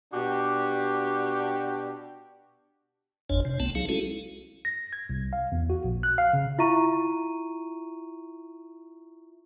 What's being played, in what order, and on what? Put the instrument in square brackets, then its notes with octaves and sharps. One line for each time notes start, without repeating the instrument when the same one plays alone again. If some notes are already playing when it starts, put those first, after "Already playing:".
[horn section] B2 D4 F#4 G4
[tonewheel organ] G#1 F2 D4 C#5
C3
C2 A3 B3 A5
F#3 D#4 G#4 F5
G#3 C#4 E4 F#4 A4
[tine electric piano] A#6
G#6
C2
F5
E2
F#4
A#1
F#6
F5
C#3
[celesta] E4 F4 E5 A#5 C#6 D#7